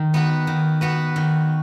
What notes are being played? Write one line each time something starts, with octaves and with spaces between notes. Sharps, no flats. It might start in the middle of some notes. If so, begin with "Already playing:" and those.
Already playing: D#3
B3 F#4 B4
D#3
B3 F#4 B4
D#3